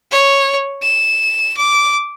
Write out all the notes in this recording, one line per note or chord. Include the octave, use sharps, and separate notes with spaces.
C#5
E7
D6